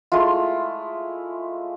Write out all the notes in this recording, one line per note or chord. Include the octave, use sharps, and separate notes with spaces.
G#3 A3 E4 F4